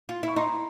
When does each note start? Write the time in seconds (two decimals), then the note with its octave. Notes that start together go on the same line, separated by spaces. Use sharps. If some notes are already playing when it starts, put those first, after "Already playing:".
0.09 F4
0.23 E4 C#6
0.36 D#4 A#5 C6